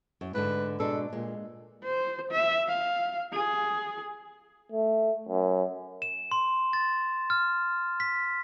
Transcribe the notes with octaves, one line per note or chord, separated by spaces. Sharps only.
F#2
G#2 D3 B4
B2 G#3 D4 A4
A#2 G#3
C5
E5
F5
G#4
A3
F#2
E7
C6
A6
F6
B6